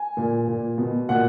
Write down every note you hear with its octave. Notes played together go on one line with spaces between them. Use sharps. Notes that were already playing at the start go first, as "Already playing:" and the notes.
Already playing: G#5
A#2
A#2
B2
A#2 F#5